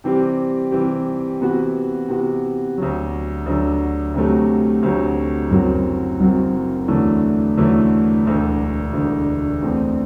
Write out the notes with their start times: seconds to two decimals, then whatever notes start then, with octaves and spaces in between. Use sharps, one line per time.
0.04 C3 E3 G3 C4 G4
0.72 C3 E3 G3 C4 G4
1.40 C3 E3 B3 F#4
2.09 C3 E3 B3 F#4
2.78 D2 D3 F#3
3.46 D2 D3 F#3
4.14 D2 C3 F#3 A3
4.83 D2 C3 F#3 A3
5.51 F#1 F#2 F#3 C4 F#4
6.20 F#1 F#2 F#3 C4 F#4
6.88 E2 D3 F#3 A3 E4
7.57 E2 D3 F#3 A3 E4
8.25 E1 D2 D3
8.93 E1 D2 D3
9.62 E2 D3 A3 C4